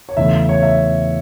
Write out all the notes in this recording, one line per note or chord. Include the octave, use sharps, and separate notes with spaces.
C#5
E2 C#3 E3 A3 E5
C#5
E5